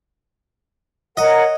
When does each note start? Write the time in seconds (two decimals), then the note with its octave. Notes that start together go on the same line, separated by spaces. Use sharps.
1.17 A#4 C#5 D#5 F#5